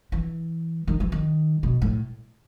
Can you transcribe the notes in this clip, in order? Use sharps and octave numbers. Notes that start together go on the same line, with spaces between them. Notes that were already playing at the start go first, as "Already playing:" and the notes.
E3
D#3
E3
D#3
B2
A2